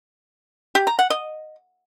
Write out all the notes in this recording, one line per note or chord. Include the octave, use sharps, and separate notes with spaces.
G4
A#5
F#5
D#5